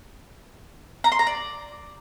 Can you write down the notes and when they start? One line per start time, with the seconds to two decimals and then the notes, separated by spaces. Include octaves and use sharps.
1.04 A#5
1.12 C6
1.19 A#5
1.27 D5